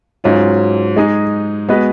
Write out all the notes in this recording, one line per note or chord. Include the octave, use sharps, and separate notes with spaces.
G#2 F#3 C#4 F4
G#3 D#4 G#4
G#3 B3 F#4 B4 D#5